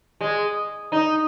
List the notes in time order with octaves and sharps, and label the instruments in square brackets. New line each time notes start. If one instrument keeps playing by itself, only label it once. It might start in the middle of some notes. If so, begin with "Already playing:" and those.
[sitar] G#3
D#4